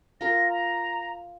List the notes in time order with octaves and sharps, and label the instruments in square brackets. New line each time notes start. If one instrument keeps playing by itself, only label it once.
[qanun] F4 A#4 [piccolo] A#6
[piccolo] A#5